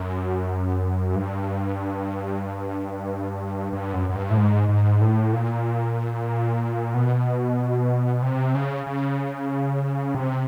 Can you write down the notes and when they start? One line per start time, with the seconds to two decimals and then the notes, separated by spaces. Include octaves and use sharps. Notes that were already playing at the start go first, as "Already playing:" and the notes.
Already playing: F#2
1.15 G2
3.73 G2
3.93 F#2
4.09 F#2
4.15 G2
4.30 A2
4.37 G#2
4.69 G#2
5.01 A2
5.33 A#2
6.94 B2
8.22 C3
8.55 C#3
8.86 C#3
10.14 C3